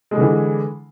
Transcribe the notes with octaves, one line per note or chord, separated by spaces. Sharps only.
D3 E3 G3 G#3